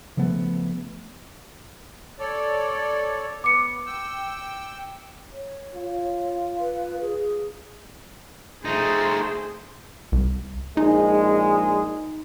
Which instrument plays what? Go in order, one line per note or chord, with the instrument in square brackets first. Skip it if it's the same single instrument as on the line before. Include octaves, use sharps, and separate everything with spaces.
[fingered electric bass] C#3 F3 A3 B3
[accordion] A4 C#5 D5
[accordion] B3 [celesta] D6 C#7
[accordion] G5 E6
[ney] C#5
[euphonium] F4
[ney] B4
G#4
[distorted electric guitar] A3 D#4 [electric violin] G#4 C5
[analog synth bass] C2
[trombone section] A#1 G#3 [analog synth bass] D#4